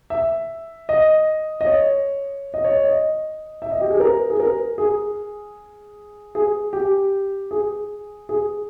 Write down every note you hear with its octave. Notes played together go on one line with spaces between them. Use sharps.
E5
D#5
D#5
C#5
D#5
C#5
D#5
E5
D#5
G4
G#4
A#4
G#4
A#4
G#4
G#4
G4
G#4
G#4